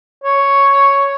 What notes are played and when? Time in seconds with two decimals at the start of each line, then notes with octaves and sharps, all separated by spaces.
0.24 C#5